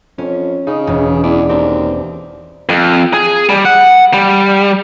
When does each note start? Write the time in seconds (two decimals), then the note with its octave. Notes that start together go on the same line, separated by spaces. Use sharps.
0.18 F2 C#4
0.67 C#3 D#4
0.87 E1
1.24 E2 D5
1.49 D#2 C4
2.69 F2
3.14 G#4
3.49 G3
3.65 F#5
4.14 G3